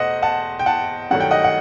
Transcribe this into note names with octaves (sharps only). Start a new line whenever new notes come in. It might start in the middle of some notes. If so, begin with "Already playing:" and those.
Already playing: E2 B2 A3 C5 D#5 F#5
F#5 A5
G5
F#5 A5
G2 D#3 F#3 A3 F#5
G5
D#5 F#5
F#5